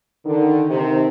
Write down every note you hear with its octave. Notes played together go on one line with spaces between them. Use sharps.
D3 D#3
C3 D#3